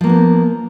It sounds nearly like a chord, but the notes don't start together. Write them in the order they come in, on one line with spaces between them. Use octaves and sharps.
F3 A#3 B3 D4